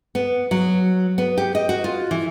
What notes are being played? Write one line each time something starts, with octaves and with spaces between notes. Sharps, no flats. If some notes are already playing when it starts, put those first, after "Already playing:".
B3
F#3
B3
G4
D#5
F#4
F4
E3